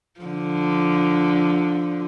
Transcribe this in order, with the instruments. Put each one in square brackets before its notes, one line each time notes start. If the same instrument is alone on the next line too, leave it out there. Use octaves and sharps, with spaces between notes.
[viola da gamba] D3 F3